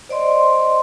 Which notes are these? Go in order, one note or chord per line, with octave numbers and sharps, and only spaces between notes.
C5 D5 D#5 C6